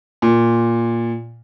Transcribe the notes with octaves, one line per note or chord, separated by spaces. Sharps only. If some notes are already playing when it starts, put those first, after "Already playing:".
A#2